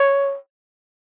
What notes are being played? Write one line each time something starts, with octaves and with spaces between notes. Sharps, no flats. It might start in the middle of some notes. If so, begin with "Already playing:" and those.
Already playing: C#5